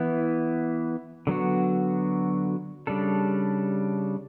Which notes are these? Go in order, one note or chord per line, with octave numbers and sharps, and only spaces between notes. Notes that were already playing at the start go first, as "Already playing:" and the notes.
Already playing: E3 B3 E4
D3 F#3 B3 F#4
C#3 G3 D4 A4